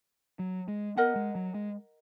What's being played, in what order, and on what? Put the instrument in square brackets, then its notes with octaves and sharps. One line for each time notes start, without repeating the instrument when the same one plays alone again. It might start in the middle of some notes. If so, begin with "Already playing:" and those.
[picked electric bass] F#3
G#3
[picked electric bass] B3 [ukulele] A#4 D#5 F#5
[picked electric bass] G#3
F#3
G#3